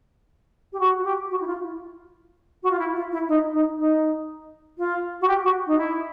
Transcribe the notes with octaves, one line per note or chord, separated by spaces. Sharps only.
G4
F#4
F#4
G4
F#4
E4
F4
E4
F#4
F4
E4
F4
E4
D#4
D#4
D#4
F4
F#4
G4
F#4
D#4
E4